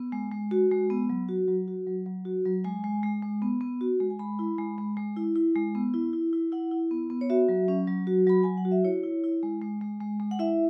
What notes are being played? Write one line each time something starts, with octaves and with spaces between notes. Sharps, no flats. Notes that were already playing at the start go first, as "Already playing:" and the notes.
Already playing: B3
G#3
G#3
F#4
G#3
B3
F#3
F#4
F#3
F#4
F#3
F#3
F#4
F#3
G#3 G#5
G#3
G#3
G#3
B3
B3
F#4
G#3
G#5
G#3 B5
E4
G#3
G#3
G#3
E4
E4
G#3
B3
E4
E4
E4
E4 F#5
E4
B3
B3
C#5
F#4 E5
F#3
C#4
F#3
F#4
F#3 B5
F#3 G#5
F#5
F#4
E5
E4 C#5
E4
E4
G#3
G#3
G#3
G#3
G#3
F#5
E4 E5